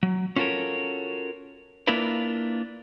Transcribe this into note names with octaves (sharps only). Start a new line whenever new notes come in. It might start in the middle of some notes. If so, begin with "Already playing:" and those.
F#3
C#4 F4 F#4 A4 A#4 C#5
A#3 D4 E4 F4 A#4 B4